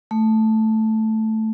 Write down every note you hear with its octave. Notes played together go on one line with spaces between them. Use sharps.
A3